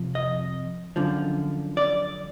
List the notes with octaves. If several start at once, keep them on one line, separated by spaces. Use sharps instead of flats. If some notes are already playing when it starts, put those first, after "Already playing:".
Already playing: F2 C3 F3
D#5
F#2 D3 F3
D5